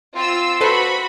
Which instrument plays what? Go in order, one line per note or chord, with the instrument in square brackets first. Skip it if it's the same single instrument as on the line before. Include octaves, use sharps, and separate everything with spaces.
[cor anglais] C4 [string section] F4 E6
[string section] F#4 B5 [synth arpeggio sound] A4 B4 C5